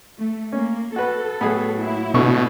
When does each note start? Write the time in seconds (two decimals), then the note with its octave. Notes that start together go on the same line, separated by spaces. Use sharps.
0.18 A3
0.52 A#3 C#4
0.96 F#4 A4 B4
1.41 A2 F#3 B3 G#4
1.78 A#3 E4
2.14 B2 D3 C#6